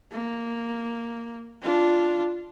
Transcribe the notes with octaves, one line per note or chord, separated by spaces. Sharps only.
A#3
D4 F4